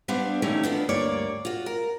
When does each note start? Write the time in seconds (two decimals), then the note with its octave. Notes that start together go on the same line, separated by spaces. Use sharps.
0.08 G3 B3 D4 C5 F5
0.42 D3 E3 A3 C4 C#4 D#4
0.63 B3 D4 E4 F4
0.89 D2 G2 A#3 C#5 D5
1.45 F4 F#4
1.66 A#4